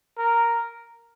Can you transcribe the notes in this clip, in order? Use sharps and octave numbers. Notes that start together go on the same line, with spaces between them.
A#4